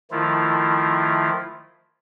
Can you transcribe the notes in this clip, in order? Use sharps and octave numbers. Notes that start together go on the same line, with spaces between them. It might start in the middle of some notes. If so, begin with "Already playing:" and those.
D#3 F3 A3 E4 F4